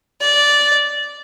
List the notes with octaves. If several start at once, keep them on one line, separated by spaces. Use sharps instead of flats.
D5